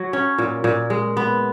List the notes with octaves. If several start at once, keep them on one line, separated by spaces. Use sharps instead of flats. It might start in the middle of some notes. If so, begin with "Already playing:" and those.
Already playing: F#3
C#4
A#2
A#2
G#3
B3